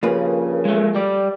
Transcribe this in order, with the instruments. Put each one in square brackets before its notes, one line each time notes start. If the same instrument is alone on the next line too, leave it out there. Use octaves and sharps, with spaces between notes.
[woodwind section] G2 A#2 C#3 [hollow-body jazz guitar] F3 A#3 B4
[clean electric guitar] G#3 A3
G3 D5